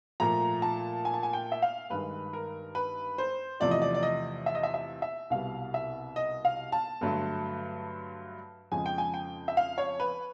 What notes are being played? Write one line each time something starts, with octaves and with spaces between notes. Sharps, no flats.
A#2 F3 A3 A#5
A5
G#5
A5
G#5
G5
E5
F5
G2 D#3 G#3 B4
A#4
B4
C5
E2 C3 F3 A3 D5
D#5
D5
D5
D#5
E5
D#5
E5
E5
E5
C2 B2 G3 F5
E5
D#5
F5
A5
G2 D3 F#3 A3
F2 C#3 F3 G#3 G#5
G5
G#5
G5
E5
F5
C#5
B4